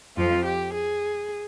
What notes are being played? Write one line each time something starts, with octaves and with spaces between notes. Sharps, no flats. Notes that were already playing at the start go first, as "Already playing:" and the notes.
F2 F3 F4
G4
G#4